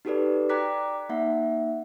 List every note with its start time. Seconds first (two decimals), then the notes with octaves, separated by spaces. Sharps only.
0.05 D#4 F#4 G4 A4 B4 D5
0.50 D5 G5 A#5 D6 F#6 B6
1.09 A#3 D#4 E5 F#5